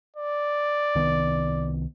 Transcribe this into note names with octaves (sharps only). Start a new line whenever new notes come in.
D5
C2 D#3 B3